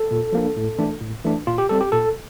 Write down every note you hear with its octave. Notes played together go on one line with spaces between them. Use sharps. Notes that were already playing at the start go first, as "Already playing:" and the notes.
Already playing: A4
A#2
F3 A#3 D4
A2
E3 A3 D4
A2
E3 A3 D4
A#2 F4
G4
G3 C4 A4
G4
A#2 A4